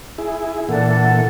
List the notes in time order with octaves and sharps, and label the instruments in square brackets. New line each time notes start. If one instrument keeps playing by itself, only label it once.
[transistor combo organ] E4 G#4
[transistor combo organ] A#2 E3 [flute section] D4 A4 F#5